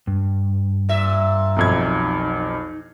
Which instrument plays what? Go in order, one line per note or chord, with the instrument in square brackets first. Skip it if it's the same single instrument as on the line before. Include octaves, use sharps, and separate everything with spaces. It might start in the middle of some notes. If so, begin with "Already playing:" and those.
[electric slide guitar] G2
[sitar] A#2 E5
[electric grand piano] B1 F2 G#6
[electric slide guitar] D#4